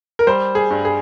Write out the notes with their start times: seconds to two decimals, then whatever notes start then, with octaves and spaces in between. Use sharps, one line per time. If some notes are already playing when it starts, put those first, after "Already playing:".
0.19 A#4
0.27 G3 C5
0.55 G#4
0.70 G2
0.85 G#4